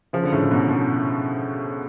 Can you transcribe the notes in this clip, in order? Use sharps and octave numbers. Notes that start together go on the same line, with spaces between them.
C#3 F3
D3
A2 C#3
G#2 B2
G#2 B2